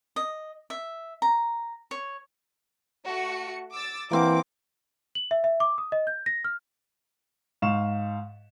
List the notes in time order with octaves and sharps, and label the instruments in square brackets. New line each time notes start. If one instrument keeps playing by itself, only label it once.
[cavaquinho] D#5
E5
A#5
C#5
[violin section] A3 F#4 C#7
D6 E6 A6
[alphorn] E3 [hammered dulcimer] A#3 C4 F#5 [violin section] D6
[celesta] F#7
E5
E5
D6
D#6
D#5
G6
A#6
F6
[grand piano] G#2 F5 C#6 E7